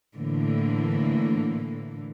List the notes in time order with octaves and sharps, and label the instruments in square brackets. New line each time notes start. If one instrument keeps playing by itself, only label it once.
[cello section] A2 D3 E3 A#3